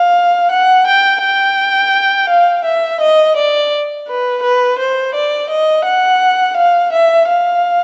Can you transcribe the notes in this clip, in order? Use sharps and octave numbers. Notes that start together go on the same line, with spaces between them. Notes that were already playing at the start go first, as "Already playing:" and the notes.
Already playing: F5
F#5
G5
G5
F5
E5
D#5
D5
B4
B4
C5
D5
D#5
F#5
F5
E5
F5